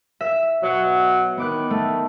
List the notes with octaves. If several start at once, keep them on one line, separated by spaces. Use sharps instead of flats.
E5
B2 F#3
D#3 B3 D6 F#6
A3